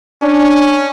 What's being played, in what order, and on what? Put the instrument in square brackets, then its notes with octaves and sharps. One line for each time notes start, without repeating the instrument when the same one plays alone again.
[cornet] C#4 [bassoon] D4